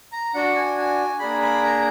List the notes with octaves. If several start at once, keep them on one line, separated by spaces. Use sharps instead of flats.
A#5
D4 F#4 F#5
G#5
G#5
A#3 D4 G#4 B5
B5
A#5